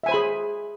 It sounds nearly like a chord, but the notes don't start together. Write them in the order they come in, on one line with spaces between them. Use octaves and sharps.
E5 G#5 C5 B5 G#4